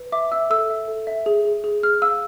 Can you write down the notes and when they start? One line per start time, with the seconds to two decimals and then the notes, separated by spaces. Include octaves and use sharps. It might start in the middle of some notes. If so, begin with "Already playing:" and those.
Already playing: B4
0.12 E5 D6
0.31 E5 E6
0.50 A4 E6
0.70 E5
0.88 A4
1.07 E5
1.26 G#4
1.45 G#4
1.64 G#4
1.83 G#4 F6
2.02 F5 E6